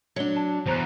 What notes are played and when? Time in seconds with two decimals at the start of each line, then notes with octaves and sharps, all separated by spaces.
0.16 F#3 D4 C#5 G7
0.36 A5
0.66 E2 C5 A#5 F#6